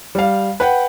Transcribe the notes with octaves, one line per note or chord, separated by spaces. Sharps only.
G3 F5
B4 F#5 G5